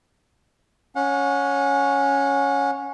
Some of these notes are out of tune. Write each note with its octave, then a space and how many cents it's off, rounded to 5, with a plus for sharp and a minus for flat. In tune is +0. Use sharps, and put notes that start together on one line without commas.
C#4 +0 F#5 -35